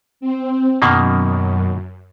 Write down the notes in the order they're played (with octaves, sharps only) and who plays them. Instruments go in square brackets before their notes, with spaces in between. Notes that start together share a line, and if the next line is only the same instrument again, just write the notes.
[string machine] C4
[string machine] F#2 [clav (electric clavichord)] B2 D#3 A#3